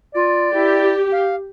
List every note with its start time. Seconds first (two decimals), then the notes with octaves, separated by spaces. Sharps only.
0.15 F4 D5
0.53 E4 G4
1.12 F5